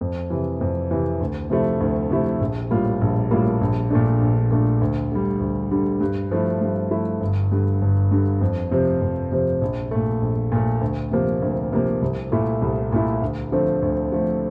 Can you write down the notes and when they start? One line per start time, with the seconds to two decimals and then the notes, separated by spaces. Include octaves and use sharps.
0.01 F2
0.30 C3 E3
0.61 F2
0.91 C3 E3
1.20 D2
1.50 C3 F3 A3 E4
1.81 D2
2.10 C3 F3 A3 E4
2.41 A#1
2.70 A2 G3 A#3 F4
3.01 A#1
3.31 A2 G3 A#3 F4
3.61 A#1
3.90 A#2 A3 D4
4.21 A#1
4.51 A#2 A3 D4
4.81 D2
5.12 D3 G3
5.40 D2
5.71 D3 G3
6.00 G2
6.31 F3 A3 E4
6.61 G2
6.91 F3 A3 E4
7.21 G1
7.52 G2 D3
7.82 G1
8.11 G2 D3
8.41 F2
8.71 C3 F3 C4
9.01 F2
9.32 C3 F3 C4
9.61 A#1
9.91 A#2 A3
10.21 A#1
10.52 A#2 A3
10.81 D2
11.11 C3 F3 A#3
11.42 D2
11.72 C3 F3 A#3
12.02 C2
12.32 A#2 A3 E4
12.62 C2
12.92 A#2 A3 E4
13.22 D2
13.52 D3 F3 A3 C4
13.82 D2
14.12 D3 F3 A3 C4